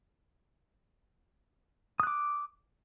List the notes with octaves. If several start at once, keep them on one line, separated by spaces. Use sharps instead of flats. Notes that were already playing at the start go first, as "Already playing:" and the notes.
D6 D#6 F#6